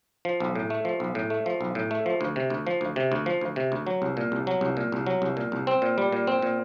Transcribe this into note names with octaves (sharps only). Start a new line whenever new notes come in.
F3
B1
A2
A3
F3
B1
A2
A3
F3
B1
A2
A3
F3
D2
C3
D2
F3
D2
C3
D2
F3
D2
C3
D2
F#3
C2
A#2
C2
F#3
C2
A#2
C2
F#3
C2
A#2
C2
C4
A#2
G3
A#2
C4
A#2